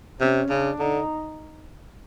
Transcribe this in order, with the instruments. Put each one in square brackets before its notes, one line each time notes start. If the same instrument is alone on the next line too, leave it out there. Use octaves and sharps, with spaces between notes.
[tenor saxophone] C3 [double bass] C#4
[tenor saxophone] C#3 [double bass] D4
[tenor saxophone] D3 [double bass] D#4